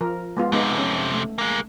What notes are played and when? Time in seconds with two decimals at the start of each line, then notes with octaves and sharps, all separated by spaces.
0.01 F3 A#4
0.37 G#3 B3 F4
0.52 F2 C3 G#3 B3 D#4
0.78 C#4
1.14 A3
1.38 G#3 A#3